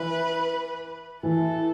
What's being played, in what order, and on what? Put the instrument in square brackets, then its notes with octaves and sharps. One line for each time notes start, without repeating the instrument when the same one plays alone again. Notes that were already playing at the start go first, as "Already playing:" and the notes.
Already playing: [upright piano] E3 [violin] B4
[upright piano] E3 [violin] A4